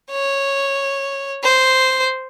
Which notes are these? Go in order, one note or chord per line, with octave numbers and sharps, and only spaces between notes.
C#5
C5